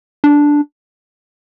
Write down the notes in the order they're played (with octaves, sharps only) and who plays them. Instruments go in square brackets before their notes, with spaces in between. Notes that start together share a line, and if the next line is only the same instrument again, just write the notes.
[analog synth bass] D4